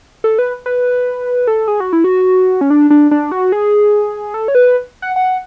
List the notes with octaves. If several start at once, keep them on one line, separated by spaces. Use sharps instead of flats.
A4
B4
B4
A4
G#4
F#4
E4
F#4
C#4
D4
D4
D4
F#4
G#4
A4
C#5
B4
F#5
F#5